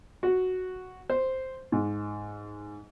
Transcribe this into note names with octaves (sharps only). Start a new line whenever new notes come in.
F#4
C5
G#2